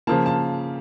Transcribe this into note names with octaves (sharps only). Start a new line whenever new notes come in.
C#3 F3 A#3 A5
A5